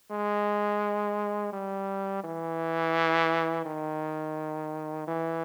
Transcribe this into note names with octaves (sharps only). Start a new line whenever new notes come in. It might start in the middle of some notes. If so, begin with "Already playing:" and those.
G#3
G3
E3
D#3
E3